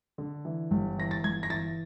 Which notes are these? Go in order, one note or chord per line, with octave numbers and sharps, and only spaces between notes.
D3
E3
G1
E3 A#6
A6
G1 G#6
A#6
E3 A6